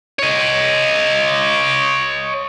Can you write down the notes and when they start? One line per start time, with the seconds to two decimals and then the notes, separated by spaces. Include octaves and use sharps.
0.19 C#5 D#5